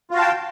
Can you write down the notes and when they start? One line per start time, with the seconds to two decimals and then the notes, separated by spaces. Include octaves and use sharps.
0.11 F4
0.13 F#4
0.16 F5
0.19 A5
0.21 G5